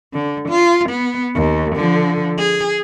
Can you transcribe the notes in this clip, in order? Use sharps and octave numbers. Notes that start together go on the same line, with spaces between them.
D3
F4
B3
D#2
D3 F3
G#4